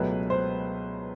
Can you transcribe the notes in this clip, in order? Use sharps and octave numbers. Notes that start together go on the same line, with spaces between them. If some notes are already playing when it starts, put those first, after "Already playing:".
Already playing: C#2 B2 F#3 A3 B4
C5